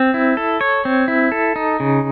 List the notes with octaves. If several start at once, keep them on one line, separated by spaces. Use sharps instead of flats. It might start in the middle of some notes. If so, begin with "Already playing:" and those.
Already playing: C4
E4
A4
C#5
C4
E4
A4
D#4
C#3